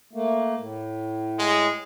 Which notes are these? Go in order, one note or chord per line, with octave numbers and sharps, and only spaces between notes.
A3 A#3
A2
G#3